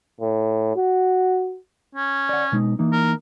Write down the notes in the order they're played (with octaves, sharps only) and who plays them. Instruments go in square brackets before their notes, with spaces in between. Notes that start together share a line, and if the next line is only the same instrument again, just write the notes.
[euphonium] A2
F#4
[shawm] C#4
[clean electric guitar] D5 F#5
B2 G#3 D#4
E3 A#3 D#4
[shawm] A#4